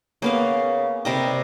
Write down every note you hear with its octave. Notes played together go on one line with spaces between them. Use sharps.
C#3 A#3 B3 F5
C3 G3 A#4 D#5